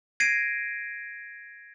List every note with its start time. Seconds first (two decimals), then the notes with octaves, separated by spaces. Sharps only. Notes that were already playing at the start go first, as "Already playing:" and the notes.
0.20 G#6 A#6 C7 D7 D#7